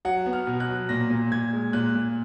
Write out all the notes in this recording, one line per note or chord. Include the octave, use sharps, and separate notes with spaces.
F#3 F#5
B3
F6
B2
F#6
F#3
A#2 A#6
A#2
A#2 G#6
G#3
A#2 F#6
A#2